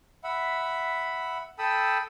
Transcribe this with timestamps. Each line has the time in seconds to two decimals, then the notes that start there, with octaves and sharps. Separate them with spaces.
0.24 E5 F#5 B5
1.59 A4 G5 A5 B5 D#6 E6